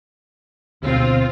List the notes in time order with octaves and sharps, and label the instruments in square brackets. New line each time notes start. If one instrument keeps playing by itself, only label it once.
[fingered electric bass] D2 B2 [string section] C4 F4